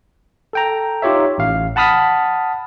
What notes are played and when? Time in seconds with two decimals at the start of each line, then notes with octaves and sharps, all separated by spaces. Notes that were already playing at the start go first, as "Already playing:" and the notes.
0.53 A4 G5 A#5
1.02 D#4 F4 G4 C#5 E5
1.38 A1 F5
1.76 F#5 A5 B5 D#6 F6 B6